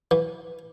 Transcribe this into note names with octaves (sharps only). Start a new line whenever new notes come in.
E3